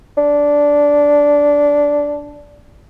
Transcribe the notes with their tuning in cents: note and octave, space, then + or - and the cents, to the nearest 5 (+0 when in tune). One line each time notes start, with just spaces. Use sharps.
D4 -10